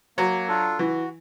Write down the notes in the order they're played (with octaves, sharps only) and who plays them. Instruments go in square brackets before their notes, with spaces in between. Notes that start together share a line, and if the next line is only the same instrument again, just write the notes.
[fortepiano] F#3 [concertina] A#3
[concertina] D4 F4 A4
[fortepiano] E3 [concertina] F#4